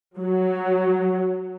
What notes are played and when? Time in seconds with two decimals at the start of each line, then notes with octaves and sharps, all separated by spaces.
0.19 F#3